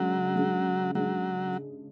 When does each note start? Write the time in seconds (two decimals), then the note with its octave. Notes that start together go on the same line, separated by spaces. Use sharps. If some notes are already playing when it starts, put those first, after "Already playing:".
Already playing: C#3 F#3 G#3 D4
0.35 C#3 G#3 D4 G#4
0.94 C#3 F#3 G#3 D4 G#4